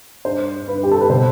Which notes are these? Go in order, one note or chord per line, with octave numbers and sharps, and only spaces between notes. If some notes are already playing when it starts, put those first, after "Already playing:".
G2 C5
G2 B4
G4
A4
B4
B2 C5